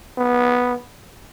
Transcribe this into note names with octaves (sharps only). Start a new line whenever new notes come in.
B3